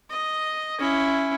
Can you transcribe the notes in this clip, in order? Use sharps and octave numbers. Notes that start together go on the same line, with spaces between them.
D#5
C#4 E4